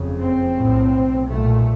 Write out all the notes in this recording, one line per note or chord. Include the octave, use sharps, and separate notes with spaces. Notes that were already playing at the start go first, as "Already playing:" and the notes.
Already playing: F#1 F2 C#3
C4
B1 A2
B1 A#2 A3